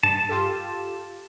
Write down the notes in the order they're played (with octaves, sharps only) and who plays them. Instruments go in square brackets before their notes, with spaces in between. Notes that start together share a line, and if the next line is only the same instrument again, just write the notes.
[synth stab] G2 [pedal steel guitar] A5
[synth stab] F4 G4 A4